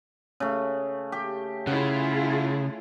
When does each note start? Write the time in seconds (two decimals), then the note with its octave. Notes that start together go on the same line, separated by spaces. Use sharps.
0.40 C#3 A3
1.12 G4
1.67 C#3 E4 F4 G#4 F#5